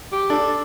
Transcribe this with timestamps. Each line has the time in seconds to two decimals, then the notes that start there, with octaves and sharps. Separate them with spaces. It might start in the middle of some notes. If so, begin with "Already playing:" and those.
0.12 G4
0.30 D4 A4